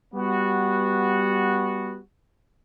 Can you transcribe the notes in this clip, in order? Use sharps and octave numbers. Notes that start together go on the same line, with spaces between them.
G3 B3 F#4